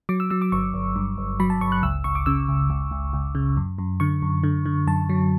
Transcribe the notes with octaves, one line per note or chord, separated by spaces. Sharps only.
F#3 D6
E6
F#3 E6
D6
G1 C#6
G1
G2
G1
F#3 B5
A5
G1 C#6
F#6
C#2 E6
C#2 C#6
D6
C#3 E6
C#2
C#2
C#2
C#2
C#3
F#2
F#2
D3 C#6
F#2
D3
D3
F#2 A5
F#3